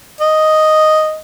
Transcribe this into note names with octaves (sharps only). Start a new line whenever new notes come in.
D#5